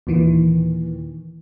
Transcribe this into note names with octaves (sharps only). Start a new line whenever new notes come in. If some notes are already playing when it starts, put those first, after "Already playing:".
D#2 A#2 D#3 E3